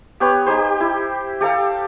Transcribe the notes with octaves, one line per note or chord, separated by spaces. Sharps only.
B3 G4 B4 C#5
D#4 G4 C5
E4
G4 A4 F5 A#5